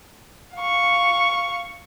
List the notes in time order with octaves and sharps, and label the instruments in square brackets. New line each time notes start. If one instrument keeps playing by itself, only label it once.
[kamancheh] F5 C#6